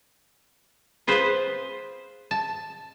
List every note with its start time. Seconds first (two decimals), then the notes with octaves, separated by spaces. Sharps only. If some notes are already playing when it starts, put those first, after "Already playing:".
1.07 F4 G#4 B4 C5
2.31 A5